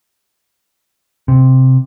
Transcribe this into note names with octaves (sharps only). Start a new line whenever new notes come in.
C3